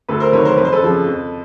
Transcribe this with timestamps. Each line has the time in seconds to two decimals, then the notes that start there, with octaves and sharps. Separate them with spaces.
0.09 D2 A4 B4
0.20 A#4 C5
0.33 C3 D#3 F#3 B4 C#5
0.45 A#4 C5
0.58 F2 B4
0.65 C5
0.73 A4 B4
0.82 C#3 F3
1.06 F2